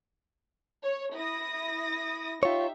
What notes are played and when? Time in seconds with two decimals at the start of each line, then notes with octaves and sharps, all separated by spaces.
0.84 C#5
1.14 E4 D#6 A#6
2.43 D#4 F4 G4 C#5 E5